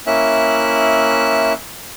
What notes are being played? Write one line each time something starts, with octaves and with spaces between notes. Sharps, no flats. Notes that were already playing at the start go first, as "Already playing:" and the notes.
A#3 C#4 E4 E5 F#6